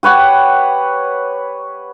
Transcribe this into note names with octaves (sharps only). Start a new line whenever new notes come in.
G4 B4 C#5 F#5